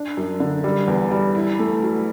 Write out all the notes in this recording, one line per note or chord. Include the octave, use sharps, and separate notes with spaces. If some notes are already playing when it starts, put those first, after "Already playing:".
Already playing: D4
F#2
D3
G3
E2
G3
E4
A3
F#3